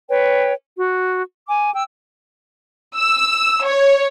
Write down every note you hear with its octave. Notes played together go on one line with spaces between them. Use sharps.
B4 C#5 G5
F#4
G#5 D6
G5 E6
E6
C#5